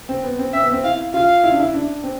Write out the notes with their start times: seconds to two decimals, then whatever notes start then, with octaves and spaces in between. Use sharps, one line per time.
0.09 C4
0.24 B3
0.39 C4
0.53 C4 E5
0.63 B3
0.72 C4
0.84 E4 F5
1.14 F4 F5
1.44 E4
1.52 D4
1.60 E4
1.74 D4
2.04 C4